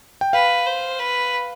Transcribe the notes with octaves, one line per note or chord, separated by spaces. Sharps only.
G5
B4 F5
C5
B4